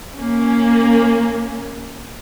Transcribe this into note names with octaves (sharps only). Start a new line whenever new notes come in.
A#3 C#4